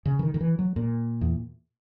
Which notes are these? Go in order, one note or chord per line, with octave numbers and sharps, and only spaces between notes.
C#3
E3
D#3
D#3
E3
F#3
A#2
E2